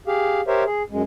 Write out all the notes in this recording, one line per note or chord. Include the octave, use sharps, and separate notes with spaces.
G4 G#4 F5
G4 A#4 C5 C#5 E5
G#4
F#2 G#3